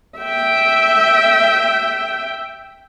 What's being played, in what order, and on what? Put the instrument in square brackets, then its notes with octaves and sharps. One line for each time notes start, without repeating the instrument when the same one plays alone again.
[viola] E5 G5